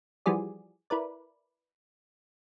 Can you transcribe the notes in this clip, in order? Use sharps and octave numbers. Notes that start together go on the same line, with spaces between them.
E3 F3 G3 F#4 G#4 D5
E4 A#4 B4 D5